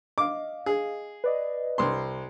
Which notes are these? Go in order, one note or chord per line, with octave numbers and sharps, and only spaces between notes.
D#5 F5 D6
G#4
B4 D5 D#5
C2 C6